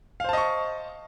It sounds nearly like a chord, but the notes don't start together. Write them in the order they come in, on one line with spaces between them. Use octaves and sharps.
F5 C5 A5 D#5 C#6